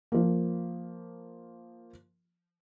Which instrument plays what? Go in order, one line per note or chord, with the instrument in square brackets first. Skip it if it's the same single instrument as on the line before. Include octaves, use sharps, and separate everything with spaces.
[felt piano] F3 A#3